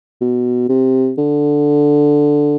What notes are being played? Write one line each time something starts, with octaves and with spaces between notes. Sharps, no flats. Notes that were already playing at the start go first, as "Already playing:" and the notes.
B2
C3
D3